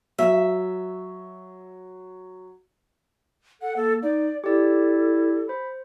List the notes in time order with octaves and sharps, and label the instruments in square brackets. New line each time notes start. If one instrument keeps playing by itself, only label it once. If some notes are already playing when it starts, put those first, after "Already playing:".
[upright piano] F#3 [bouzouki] E5
[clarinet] A4 [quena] F#5
[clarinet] A#3 [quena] A4
[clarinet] D#4 [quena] D5
[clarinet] E4 [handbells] G4 D5 [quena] A4
[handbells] C5 [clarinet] B5